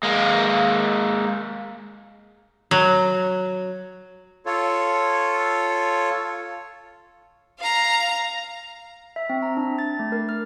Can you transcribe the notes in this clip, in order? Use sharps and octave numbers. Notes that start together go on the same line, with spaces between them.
G#3 A#3
F#3
F4 A4 C#5
F5 A#5
E5
C4
A#5
D4
A6
A3
A#4
F6